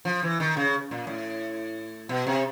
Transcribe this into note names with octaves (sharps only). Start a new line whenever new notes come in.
F3
E3
D#3
C#3
A#2
A2
B2
C3